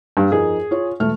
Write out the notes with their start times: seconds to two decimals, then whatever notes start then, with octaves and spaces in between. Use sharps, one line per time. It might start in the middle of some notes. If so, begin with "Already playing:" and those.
0.17 G2 F5
0.32 F2 D#4 G#4 A#4
0.71 F4 C#5
1.00 E1 A3 F6